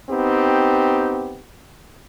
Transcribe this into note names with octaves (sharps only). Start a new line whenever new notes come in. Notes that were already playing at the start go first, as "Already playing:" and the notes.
B3 C4 D#4 G4